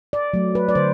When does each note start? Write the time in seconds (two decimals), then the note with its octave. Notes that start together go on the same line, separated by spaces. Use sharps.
0.13 D5
0.34 F#3 A3
0.55 B4
0.69 D5
0.75 D3 C5